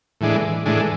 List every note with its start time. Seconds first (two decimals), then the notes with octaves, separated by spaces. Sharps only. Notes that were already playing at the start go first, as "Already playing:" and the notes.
0.21 A2 E3 G#3 D4
0.65 A2 E3 G#3 D4